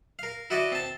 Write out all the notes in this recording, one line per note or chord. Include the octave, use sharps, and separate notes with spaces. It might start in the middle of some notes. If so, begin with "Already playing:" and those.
A#4 F5
E4 F#4 D5 D#5
C4 A5